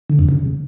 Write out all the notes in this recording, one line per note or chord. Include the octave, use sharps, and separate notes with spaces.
D3
F2
C#3